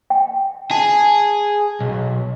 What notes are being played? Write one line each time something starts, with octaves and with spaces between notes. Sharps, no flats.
G5
G#4 A5
B1